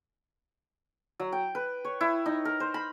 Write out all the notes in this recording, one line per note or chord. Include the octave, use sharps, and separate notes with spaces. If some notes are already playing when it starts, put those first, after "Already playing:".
F#3
G5
B4
C#5
E4
D#4
A#4
C5
B5